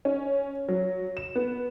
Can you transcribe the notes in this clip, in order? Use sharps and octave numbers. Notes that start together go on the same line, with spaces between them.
C#4
F#3
E7
B3